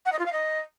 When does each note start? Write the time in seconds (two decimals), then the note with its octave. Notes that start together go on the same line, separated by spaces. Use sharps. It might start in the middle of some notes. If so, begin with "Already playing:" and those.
0.05 F#5
0.12 D#5
0.19 F4
0.25 F5
0.32 D#5